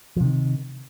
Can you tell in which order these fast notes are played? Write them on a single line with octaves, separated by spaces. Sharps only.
F3 C3 D#3